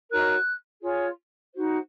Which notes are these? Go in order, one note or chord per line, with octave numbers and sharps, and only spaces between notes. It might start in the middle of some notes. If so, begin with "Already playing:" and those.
D#4 F#4 A#4 C#5 F#6
F4 G#4 C#5
D#4 F#4 C5